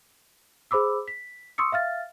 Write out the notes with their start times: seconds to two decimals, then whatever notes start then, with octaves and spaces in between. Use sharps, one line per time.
0.71 G#4 C5 B5 D6 E6
1.08 B6
1.58 C6 C#6 D#6 E6 C#7
1.72 E5 F5 F6 A6